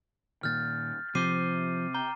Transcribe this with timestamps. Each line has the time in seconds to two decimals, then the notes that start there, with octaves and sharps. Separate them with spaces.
0.43 A#2 D#3 F6 G6 A6
1.15 C3 F3 C4 C5 D6 C7 D#7
1.95 G5 A#5